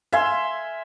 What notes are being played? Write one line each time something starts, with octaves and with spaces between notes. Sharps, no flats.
E5 F5 G#5 C6